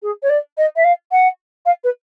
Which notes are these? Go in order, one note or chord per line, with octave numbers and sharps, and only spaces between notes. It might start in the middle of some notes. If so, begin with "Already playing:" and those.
G#4
C#5
D5
D#5
E5
F5
F#5
F5
B4